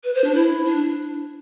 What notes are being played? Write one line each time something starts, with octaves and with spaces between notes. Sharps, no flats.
B4
C5
D4
E4
D4